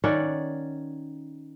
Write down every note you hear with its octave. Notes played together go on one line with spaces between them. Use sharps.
D#3 C#4 D5 F#5